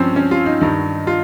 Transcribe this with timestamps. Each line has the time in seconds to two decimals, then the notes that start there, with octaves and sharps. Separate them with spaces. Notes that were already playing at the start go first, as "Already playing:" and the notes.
Already playing: G2 F3 C4 C#4
0.16 C#4
0.31 F4
0.46 D#4
0.61 G2 D#3 D#4
1.07 F4